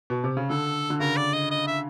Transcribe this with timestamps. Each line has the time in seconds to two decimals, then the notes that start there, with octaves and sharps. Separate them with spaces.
0.10 B2
0.24 C3
0.37 C#3
0.50 D3 A4
0.90 D3
1.00 C#3 A#4
1.17 D5
1.33 D#5
1.51 D#5
1.67 E5